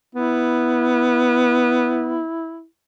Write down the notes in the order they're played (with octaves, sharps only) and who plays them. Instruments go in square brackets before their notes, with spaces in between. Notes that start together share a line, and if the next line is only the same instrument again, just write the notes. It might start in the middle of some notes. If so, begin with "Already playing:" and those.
[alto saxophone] B3 [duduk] E4